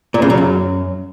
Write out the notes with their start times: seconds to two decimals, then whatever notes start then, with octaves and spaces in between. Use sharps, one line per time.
0.14 A#2
0.22 C#3
0.30 F#3
0.38 F#2